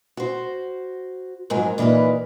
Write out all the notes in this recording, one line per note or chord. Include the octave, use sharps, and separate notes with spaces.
F#4 C5
F2 G#2 F#3 A#4 G#5
A#2 E3 D#4 A#4 B4